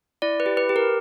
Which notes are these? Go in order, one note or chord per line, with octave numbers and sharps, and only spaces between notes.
E4 D5
B4
G4
B4
G4
A#4